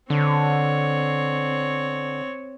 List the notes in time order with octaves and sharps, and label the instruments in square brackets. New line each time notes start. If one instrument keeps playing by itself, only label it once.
[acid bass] D3 [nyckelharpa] C4 C#5